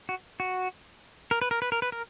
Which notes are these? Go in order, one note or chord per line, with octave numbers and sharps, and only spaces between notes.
F#4
F#4
A#4
B4
A#4
B4
A#4
B4
A#4